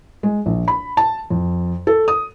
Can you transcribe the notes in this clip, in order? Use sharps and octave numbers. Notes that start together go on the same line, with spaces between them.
G#3
A#1
B5
A5
F2
A4
D#6